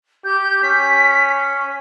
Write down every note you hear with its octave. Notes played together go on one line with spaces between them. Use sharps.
G4 G6
C#4 B6